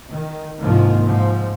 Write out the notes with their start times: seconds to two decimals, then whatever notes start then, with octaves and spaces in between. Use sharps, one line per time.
0.10 D#3
0.60 C2 G#2 D#3 F3 A#3
1.05 G#2 F3